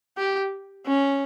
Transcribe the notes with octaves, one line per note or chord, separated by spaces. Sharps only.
G4
C#4